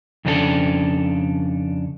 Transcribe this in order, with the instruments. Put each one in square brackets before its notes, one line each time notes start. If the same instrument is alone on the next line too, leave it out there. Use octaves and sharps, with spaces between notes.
[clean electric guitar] F2 C#3 D4 E4 A4